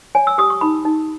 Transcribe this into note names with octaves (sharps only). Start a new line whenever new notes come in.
C#5 G#5
E6
G4 D#6
C#6
D#4 B5
D#4